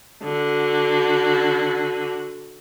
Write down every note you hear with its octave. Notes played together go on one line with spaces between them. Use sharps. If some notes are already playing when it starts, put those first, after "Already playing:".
D3 F#4